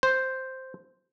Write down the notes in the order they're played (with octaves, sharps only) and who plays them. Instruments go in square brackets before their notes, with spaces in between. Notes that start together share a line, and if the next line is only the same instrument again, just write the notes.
[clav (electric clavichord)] C5